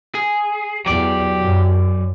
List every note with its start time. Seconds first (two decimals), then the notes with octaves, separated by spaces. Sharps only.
0.15 G#4
0.86 E2 F#3 G4 D5
1.40 F#2